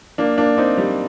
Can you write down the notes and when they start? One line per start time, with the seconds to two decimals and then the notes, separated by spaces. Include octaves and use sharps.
0.18 A#3 D4
0.38 A#3 D4
0.58 C4 D#4
0.78 G3